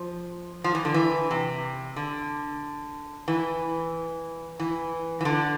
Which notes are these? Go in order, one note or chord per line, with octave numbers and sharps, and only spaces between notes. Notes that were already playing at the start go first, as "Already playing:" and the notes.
Already playing: F3
F3
E3
D3
E3
C3
D3
E3
E3
E3
D3